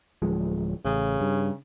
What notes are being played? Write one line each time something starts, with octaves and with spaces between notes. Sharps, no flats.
D1 F3 G#3
A1 C#3
G2